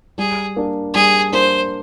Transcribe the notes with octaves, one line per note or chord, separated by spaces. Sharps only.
G3 G#4
A#3 D4
G3 G#4
A#3 D4 C5